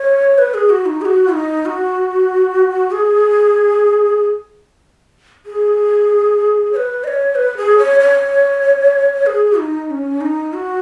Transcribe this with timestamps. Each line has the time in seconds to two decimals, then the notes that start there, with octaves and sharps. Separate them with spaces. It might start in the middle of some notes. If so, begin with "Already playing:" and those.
Already playing: C#5
0.38 B4
0.54 G#4
0.70 F#4
0.86 D#4
1.01 G#4
1.05 F#4
1.33 D#4
1.65 F#4
2.91 G#4
5.46 G#4
6.73 C#5
6.76 B4
7.04 D#5
7.08 C#5
7.35 B4
7.57 G#4
7.78 C#5
8.00 C#5
9.26 G#4
9.58 D#4
9.90 C#4
10.21 D#4
10.53 F#4